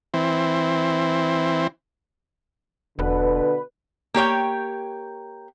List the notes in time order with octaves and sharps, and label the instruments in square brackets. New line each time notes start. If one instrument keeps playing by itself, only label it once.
[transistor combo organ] E3 C4
[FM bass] E1 [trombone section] B2 D3 [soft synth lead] B4
[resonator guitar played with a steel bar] A#3 G4 C#5 G5